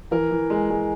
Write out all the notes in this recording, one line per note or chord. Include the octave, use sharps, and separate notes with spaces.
E3 A#4
E3
G#3
G#3